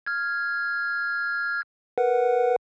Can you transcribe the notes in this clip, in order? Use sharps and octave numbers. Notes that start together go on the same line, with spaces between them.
F6 G#6
A#4 B4 F#5